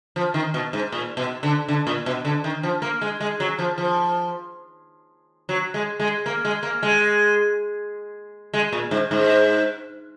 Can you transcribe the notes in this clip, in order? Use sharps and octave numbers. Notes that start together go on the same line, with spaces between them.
F3
D#3
B2
G#2
A#2
B2
D3
D3
A#2
B2
D3
D#3
F3
A#3
G#3
G#3
F#3
F3
F3
F#3
G#3
G#3
A#3
G#3
A#3
G#3
G#3
A#2
G#2
G#2